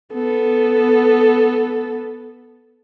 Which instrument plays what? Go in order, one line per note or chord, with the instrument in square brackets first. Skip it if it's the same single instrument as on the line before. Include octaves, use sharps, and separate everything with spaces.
[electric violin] B3 A4